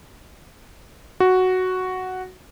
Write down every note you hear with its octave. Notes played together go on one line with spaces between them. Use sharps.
F#4